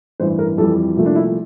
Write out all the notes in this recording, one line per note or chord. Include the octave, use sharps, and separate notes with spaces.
A1 G2 E3 C5
A#4
F2 E3 G3 A4
C2 A#2 F3 A3
D4
E4